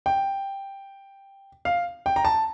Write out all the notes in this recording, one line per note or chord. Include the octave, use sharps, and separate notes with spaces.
G5
F5
G5
A#5
A5